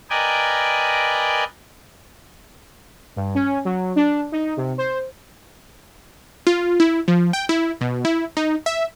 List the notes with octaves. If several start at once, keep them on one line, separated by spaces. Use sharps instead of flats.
A#4 B4 D5 D#5 G5 G#5
G2
C#4
F#3
D4
D#4
C3
C5
F4
E4
F3
G5
E4
B2
E4
D#4
E5